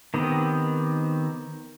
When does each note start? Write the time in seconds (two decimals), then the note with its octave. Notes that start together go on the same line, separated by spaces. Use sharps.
0.14 D#3 B3 C4 G4 D#5